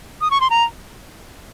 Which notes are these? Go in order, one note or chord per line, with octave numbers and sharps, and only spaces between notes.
D#6
C#6
C6
A#5